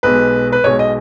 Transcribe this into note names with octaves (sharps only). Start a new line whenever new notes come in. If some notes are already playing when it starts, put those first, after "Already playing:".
B1 B2 G#3 B4
B4
B1 B2 G#3 C#5
D#5